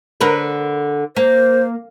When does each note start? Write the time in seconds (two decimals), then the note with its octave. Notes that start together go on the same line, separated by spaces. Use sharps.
0.21 D3 A#4 B4
1.16 A#3 C5